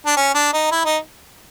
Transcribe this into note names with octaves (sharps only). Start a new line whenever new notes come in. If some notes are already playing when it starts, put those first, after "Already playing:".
D4
C#4
D4
D#4
E4
D#4